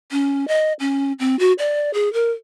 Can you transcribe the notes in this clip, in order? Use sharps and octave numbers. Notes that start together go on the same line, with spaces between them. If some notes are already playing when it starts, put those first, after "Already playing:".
C#4
D#5
C#4
C4
F#4
D5
G#4
A#4